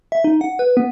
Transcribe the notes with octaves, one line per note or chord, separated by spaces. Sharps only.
E5
D#4
F#5
B4
B3